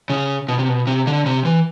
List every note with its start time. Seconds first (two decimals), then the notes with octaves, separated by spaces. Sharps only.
0.10 C#3
0.49 B2
0.59 C3
0.68 B2
0.87 C3
1.07 D3
1.26 C3
1.45 E3